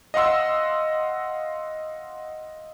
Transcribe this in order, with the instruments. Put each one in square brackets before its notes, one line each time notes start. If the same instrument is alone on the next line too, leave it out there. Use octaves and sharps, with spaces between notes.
[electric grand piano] D#5 F5 F#5 C6 E6